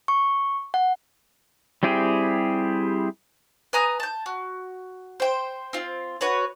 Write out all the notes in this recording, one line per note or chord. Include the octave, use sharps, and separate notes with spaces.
C#6
F#5
G3 C4 E4 G4 G#4
B4 G#5 A#5 D#6
A5 G6
F#4
C5 G5
C4 F4
F#4 B4 C#5